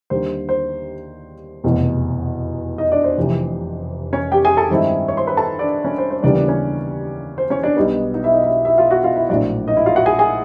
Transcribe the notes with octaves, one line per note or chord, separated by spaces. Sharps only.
D#2 D3 G3 C5
C5
F1 E2 B2
D#4 D#5
D4 D5
C5
F1 F2 C3 E3
C#4 C#5
G4 G5
G#4 G#5
A4 A5
G2 D#3 G#3 C4 E4
C#5 C#6
C5 C6
B4 B5
A4 A5
D4 D5
C#4 C#5
C5
C5
D#2 C#3 E3 G3 B3 D4 D5
D4 D5
C#4 C#5
C5
C#4 C#5
D4 D5
B1 B2 G3 B3 D#4
D#4 D#5
E4 E5
D#4 D#5
E4 E5
E4 E5
F4 F5
F#4 F#5
F4 F5
E4 E5
A#1 A2 F#3 D4 D5
D#4 D#5
E4 E5
F4 F5
F#4 F#5
G#4 G#5
G#4 G#5